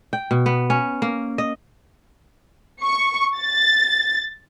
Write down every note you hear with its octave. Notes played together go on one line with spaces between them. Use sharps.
G5
B2
B3
C#4
A#3
D#5
C#6
A6